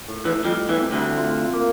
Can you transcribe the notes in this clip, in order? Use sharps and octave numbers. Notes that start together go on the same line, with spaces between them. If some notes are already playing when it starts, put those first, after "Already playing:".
A2
E2 E3
F2 F3 G3
E2 E3
C3
D2 D3
F4
A#3